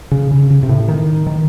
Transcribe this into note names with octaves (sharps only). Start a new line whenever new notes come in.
C#3
C#3
C#3
C3
A2
D#3
D#3